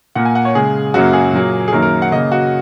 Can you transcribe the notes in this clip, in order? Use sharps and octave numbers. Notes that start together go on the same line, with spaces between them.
A#2 A#3 F#5
G#5
F#5
C#5
C#3 G#3 G#4
F#2 C#3 F#3 A#3 F#4
G#4
A#2 F#3 A#3
G#4
F#2 D#3 F#3 A#3 A#4
A#4
F#5
C#3 A#3 D#5
F#4